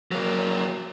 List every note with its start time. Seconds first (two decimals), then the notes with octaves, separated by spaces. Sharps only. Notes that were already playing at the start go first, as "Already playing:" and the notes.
0.12 F#3 A#3